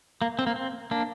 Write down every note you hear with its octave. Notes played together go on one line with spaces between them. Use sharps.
A#3
C4
A#3
C4
A#3 D4